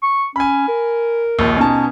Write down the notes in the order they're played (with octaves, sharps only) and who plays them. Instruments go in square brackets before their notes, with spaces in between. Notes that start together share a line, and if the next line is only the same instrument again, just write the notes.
[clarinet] C#6
[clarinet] C#4 [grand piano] G#5 B5
[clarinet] A#4
[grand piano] A#1 D#2
[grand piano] B2 D#4 A5 [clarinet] C#4